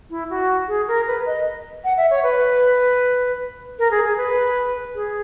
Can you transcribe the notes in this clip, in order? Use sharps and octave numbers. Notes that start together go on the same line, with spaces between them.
E4
F#4
G#4
A#4
B4
D#5
F#5
E5
C#5
B4
A#4
G#4
G#4
B4
G#4